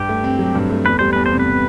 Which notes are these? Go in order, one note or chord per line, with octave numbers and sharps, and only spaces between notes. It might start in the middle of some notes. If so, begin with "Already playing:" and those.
Already playing: G2 G4
A3
C4
F#3
G2
A3
E2 B4
G3 C5
E2 B4
C5
C3
B4